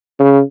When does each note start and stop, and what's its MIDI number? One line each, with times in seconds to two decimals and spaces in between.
0.20 0.40 49